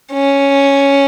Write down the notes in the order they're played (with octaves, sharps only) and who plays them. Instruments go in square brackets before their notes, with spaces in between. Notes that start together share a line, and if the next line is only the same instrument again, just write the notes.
[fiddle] C#4